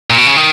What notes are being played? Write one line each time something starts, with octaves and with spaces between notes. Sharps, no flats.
A#2
B2
C#3
D#3